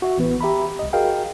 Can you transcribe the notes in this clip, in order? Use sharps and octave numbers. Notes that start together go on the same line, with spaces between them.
F#4 E5
A1 E3 B3 B4
G4 E5 A#5 B5
C2 D#5
F#4 G#4 A#4 D#5 F5 G5